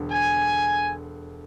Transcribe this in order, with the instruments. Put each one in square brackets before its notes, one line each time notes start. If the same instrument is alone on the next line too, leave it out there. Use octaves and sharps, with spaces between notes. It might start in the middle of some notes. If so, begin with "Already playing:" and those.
Already playing: [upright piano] E1 D3
[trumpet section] G#5